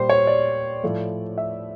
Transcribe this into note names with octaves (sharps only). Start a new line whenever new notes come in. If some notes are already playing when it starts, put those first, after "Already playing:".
Already playing: A#2 G3 C5
C#5
D5
A2 F3 A3
E5